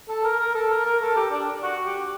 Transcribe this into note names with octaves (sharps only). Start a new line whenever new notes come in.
A4
A#4
A#4
A4
A#4
A#4
A4
G4
D4
F#4
G4